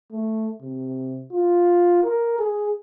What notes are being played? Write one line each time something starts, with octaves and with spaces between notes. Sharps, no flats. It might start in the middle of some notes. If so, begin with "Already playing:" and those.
A3
C3
F4
A#4
G#4